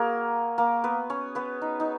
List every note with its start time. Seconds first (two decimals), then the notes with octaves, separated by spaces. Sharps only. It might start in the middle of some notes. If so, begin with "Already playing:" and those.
Already playing: A#3 F#4 G#4 A#4
0.58 A#3 A#4
0.84 B3 B4
1.10 C#4 C#5
1.35 B3 B4
1.61 D#4
1.80 D#4